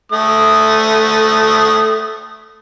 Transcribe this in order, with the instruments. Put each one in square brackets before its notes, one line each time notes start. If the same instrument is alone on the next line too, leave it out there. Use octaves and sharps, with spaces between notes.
[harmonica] A3 D#6